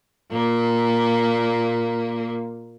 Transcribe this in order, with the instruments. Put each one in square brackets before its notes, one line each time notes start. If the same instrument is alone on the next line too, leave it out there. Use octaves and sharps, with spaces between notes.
[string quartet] A#2 A#3